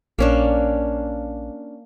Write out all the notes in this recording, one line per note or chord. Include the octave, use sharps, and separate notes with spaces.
A#1 A#3 C#4 D4